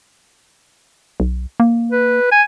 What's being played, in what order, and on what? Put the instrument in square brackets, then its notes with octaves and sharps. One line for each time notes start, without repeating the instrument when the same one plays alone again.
[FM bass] B1
A#3
[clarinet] B4
G#5